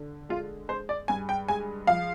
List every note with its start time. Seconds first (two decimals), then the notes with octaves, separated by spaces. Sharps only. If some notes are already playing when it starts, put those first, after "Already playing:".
Already playing: D3
0.29 G#3 F4
0.69 G#3 C5
0.89 D5
1.08 G2 G#5
1.29 G5
1.49 G#3 G#5
1.87 F3 F5